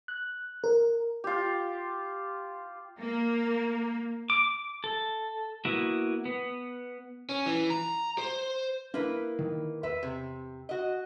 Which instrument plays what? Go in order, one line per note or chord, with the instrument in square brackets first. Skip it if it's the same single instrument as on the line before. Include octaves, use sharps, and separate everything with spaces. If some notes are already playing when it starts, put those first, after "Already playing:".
[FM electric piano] F#6
A#4
[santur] F4 G4
[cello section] A#3
[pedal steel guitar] D6
A4
A#3 B3 E4 F#4
B3
[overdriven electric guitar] C#4
E3
A#5
C5
[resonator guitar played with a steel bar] A#3 E4 B4 [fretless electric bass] D4
[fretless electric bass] D#3
[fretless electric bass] E2 [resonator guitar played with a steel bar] B4 E5
[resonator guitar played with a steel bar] C3
F#4 D#5